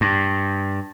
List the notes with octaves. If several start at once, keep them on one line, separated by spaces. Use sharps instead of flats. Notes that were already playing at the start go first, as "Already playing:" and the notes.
G2